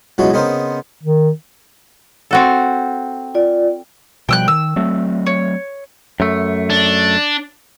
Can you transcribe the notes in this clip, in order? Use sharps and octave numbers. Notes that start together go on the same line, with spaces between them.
C#2 B2 E3 F#3 G#3 F#4
C#3 B3 C4 D#4 A#4 C5
D#3
C4 F#4 A4
F4 D5
B2 F3 G3 G5 E6 F#6
D#3 E6
F#3 A3 C4
C#5
F#2 A3
D4